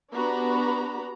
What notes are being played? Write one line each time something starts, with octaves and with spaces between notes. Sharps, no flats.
B3 D4 F#4 G4 A#5 B5